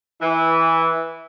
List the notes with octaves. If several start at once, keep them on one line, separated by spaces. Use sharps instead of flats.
E3